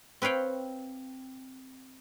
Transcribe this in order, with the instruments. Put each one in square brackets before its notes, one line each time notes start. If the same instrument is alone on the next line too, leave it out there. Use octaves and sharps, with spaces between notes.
[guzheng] C4 B4 C#5 F5 G5